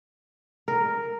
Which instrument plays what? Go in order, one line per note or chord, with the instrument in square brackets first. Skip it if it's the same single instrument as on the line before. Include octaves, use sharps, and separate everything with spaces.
[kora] A#4